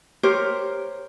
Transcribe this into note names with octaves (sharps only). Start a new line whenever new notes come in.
G4 A#4 C5 C#5